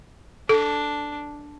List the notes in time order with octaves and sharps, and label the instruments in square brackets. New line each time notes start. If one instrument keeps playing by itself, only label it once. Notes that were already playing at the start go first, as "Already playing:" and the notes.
[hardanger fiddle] D4 [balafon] A4